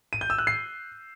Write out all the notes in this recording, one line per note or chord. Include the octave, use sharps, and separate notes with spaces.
D#7
G6
E6
F#6
C7